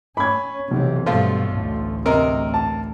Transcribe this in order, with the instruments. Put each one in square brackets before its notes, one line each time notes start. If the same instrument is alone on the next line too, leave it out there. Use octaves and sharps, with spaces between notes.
[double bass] C#4 [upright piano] B5 G#6
[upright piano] B1 [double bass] C3 E3
[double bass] G2 B2 [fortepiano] F3 A3 F4
[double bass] A1 D2
[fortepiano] C3 A#4 [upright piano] D#5
[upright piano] A5